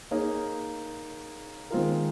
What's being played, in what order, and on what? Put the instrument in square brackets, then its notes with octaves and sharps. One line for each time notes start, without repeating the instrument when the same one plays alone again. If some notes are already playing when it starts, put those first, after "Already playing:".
[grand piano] A#3 D#4 G#4 C#5
D#3 G#3 C4 F4 A#4